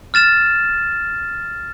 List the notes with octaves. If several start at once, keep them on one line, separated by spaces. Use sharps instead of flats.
F6 A6 E7